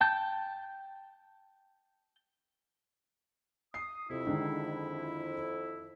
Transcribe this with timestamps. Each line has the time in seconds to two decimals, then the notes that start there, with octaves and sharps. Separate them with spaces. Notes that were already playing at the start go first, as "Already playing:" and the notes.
0.01 G5 A5 G6
3.74 D#6 C7
4.10 F2 C3 E4
4.26 D3 D#3 G#3